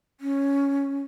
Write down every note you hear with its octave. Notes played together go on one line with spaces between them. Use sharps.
C#4